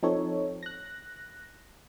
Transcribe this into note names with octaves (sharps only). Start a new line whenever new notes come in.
F3 C4 D#4 A4 C#5
F#6 A#6